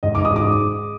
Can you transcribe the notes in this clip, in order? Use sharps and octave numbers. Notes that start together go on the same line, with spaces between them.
G#2 D#5
G#2 D6
D#6
G#2 D6